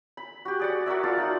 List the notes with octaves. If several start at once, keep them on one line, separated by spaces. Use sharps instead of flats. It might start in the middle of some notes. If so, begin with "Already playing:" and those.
B5
F#4 G4
G#4 D5 F#5
F#4 A#4 D5 E5
F4 A5 A#5
D#4 F#5